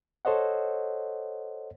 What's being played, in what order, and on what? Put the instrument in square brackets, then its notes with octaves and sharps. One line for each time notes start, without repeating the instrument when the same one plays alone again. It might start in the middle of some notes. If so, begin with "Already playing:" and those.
[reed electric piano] A4 C5 C#5 D#5 F#5